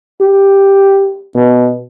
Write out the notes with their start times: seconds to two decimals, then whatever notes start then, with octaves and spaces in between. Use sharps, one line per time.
0.21 G4
1.36 B2